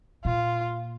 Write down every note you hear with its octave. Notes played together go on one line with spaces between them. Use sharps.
A#2 F4